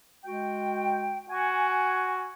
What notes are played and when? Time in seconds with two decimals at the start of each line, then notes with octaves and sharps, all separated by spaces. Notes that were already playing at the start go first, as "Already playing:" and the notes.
0.25 G#3 F#4 G5
1.30 F#4 G#5